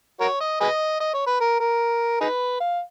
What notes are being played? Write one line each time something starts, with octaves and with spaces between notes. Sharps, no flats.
F#4 A#4 C#5
D#5
G#4 B4 D#5
D#5
C#5
B4
A#4
A#4
D#4 G#4 B4
F5